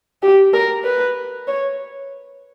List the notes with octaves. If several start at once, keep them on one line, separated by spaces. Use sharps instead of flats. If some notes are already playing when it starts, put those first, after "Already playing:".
G4
A#4
B4
C#5